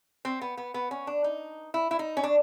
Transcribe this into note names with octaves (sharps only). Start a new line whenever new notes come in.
C4
B3
B3
B3
C#4
D4
D#4
E4
E4
D#4
C#4
D4